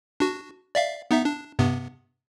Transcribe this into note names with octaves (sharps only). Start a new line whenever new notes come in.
D4 F#4
D5 E5 F5
B3 D#4 E5
D4
G2 C3 B3